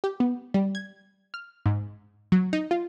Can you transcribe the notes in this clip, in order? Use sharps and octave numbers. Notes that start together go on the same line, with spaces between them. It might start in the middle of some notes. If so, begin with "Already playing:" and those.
G4
B3
G3
G#6
F6
G#2
F#3
D#4
F4